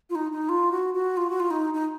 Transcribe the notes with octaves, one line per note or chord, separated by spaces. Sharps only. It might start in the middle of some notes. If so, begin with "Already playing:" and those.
F4
D#4
D#4
F4
F#4
F#4
F4
F#4
F4
D#4
D#4